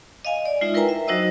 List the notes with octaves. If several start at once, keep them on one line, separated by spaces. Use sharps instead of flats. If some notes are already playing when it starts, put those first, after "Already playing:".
D#5 F5 G#5
D5
G#3 D#4 F4 E5
E4 A#4 B4 G5 G#5 A#5
E5
F#3 D#4 F#4 C5 D#5 E6